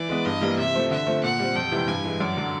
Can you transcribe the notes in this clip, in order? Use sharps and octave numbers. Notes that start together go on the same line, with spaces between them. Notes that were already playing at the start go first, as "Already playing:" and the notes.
Already playing: E3 D5
G#3 B3
G2 D#5
E3 G3 A#3
C3 E5
F3 A3 C4
D3 E5
F3 A3 C4
A#2 F#5
G3 C4
F2 G5
C3 E3 G3
G2 G#5
E3 G#3
F#2 D5
D3 F#3